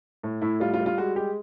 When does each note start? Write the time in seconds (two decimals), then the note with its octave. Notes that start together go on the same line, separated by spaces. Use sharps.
0.23 A2
0.42 A2 E4
0.60 G3 F4
0.74 F4
0.79 G3
0.86 F4
0.98 G#3 F#4
1.16 G#3 G4